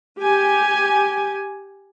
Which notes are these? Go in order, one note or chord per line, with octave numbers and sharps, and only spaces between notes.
G4 G#5